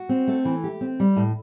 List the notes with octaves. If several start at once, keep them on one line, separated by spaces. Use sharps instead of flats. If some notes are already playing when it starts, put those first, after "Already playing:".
Already playing: F#4
C4
A3
E3
G4
C4
G3
A2